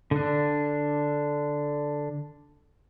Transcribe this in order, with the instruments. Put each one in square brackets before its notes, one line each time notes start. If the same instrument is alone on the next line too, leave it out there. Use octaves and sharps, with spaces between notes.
[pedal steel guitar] D3 D4